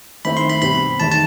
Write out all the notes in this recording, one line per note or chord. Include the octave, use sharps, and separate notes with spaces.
D#3 A3 C4 E4 B5
C6
B5
B2 G3 C4 B5
E2 D#3 A3 A5
A5